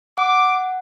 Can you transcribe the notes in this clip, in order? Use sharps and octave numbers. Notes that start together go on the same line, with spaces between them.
F#5 D6